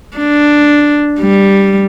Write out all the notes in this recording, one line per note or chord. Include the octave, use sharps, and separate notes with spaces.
D4
G3